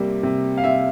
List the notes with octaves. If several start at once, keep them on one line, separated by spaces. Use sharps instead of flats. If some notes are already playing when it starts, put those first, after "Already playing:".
Already playing: C3 G3 A#3
C3
F5
C3 E5